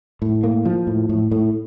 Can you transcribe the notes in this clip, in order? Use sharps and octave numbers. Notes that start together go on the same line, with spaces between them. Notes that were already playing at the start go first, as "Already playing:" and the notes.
A2
A#3
F3
A2
A2
A2